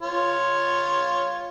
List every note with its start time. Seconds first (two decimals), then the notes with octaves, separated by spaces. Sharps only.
0.02 F4 C#5